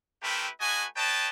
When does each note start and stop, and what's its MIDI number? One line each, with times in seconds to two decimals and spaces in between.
0.23 0.48 57
0.23 0.48 60
0.23 0.48 64
0.23 0.48 67
0.23 0.48 70
0.23 0.48 71
0.61 0.85 57
0.61 0.85 66
0.61 0.85 71
0.61 0.85 75
0.61 0.85 80
0.96 1.30 71
0.96 1.30 73
0.96 1.30 75
0.96 1.30 79
0.96 1.30 81